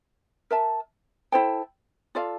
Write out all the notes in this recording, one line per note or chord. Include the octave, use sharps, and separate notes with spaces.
A#4 E5 A5
E4 A4 C5 G5
F4 A4 D5 F5